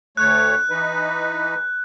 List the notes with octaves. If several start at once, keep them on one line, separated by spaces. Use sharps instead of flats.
D2 A3 C#5 F#6
E3 D#4 B4